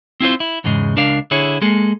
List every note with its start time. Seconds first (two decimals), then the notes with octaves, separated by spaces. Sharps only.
0.20 C4 E4 F4 C5
0.40 E4
0.64 E2 G#2 C#3 G#3
0.96 C#2 D4 A#4 D5 F5
1.31 D3 E4 G#4 C#5
1.62 G#3 A#3 G#4 A4